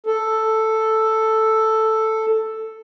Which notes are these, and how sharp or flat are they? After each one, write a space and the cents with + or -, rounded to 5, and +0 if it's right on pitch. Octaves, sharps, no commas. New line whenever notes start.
A4 +0